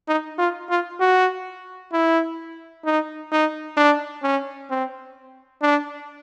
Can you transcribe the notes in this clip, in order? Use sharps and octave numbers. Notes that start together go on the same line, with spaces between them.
D#4
F4
F4
F#4
E4
D#4
D#4
D4
C#4
C4
D4